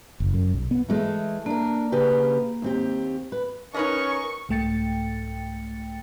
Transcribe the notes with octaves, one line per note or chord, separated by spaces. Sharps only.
F#1
F#2
B1
B3
E3 G#3 A3
A#3 D4 A#4
C#3 G4 B4
D#2 C4 G4
B4
C#4 D#4 A#4 B4 D#5 C#6
C2 G#2 A3 G5 A6 C#7